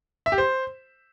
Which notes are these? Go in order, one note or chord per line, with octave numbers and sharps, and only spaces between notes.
E5
G4
C5